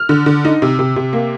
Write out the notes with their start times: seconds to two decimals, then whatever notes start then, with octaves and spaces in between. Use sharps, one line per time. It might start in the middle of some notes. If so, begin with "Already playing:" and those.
Already playing: F6
0.09 D3
0.26 D3
0.45 D#4
0.62 C3
0.79 C3
0.96 C3
1.13 A#3